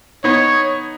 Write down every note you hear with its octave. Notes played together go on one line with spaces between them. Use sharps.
B3 D#4 C#5